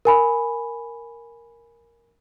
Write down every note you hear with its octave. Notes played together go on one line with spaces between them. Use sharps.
A#4 G#5 B5